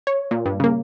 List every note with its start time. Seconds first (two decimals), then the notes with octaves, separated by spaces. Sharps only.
0.07 C#5
0.31 A#2
0.46 G2
0.60 C#3 A#3